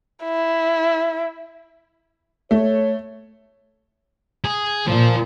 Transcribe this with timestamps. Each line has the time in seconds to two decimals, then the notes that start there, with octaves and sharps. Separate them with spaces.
0.24 E4
2.51 A3 C#5
4.44 G#4
4.87 A#2 F3